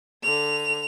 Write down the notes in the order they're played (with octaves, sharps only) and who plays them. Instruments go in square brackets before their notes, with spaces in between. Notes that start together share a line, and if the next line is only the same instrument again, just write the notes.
[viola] D3 [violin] F7